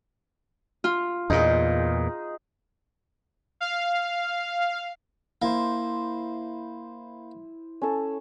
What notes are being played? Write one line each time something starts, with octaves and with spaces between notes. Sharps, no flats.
F4
E2 A#2 D#4 G#4
F5
A#3 E4 C5
C#4 A4